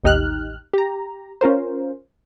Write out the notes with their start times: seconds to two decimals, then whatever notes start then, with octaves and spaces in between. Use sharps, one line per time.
0.04 A1 D#2 D#4 G4 F6 F#6
0.73 G4 A#5
1.41 C#4 F4 A#4 C5